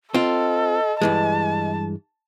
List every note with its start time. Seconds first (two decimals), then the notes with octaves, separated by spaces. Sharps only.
0.14 C4 F4 A4 D#5
1.02 G2 E3 G#3 A5